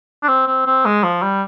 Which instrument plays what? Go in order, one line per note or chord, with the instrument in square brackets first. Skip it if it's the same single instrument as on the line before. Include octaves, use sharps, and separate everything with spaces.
[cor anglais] D4
C4
C4
C4
G#3
F3
G3